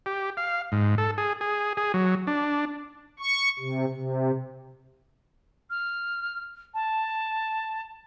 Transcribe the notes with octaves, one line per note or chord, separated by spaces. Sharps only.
G4
F5
G#2
A4
G#4
G#4
G#4
F#3
D4
C#6
C3
C3
F6
A5